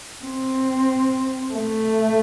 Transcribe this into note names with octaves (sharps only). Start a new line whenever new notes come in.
C4
A3